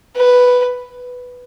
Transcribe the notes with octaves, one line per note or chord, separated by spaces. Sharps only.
B4